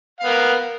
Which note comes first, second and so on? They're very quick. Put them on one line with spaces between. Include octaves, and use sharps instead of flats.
F5 B3 A#4